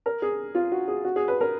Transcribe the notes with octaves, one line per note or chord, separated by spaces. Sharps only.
A#4
G#4
F4
F#4
G#4
F#4
G#4
B4
A#4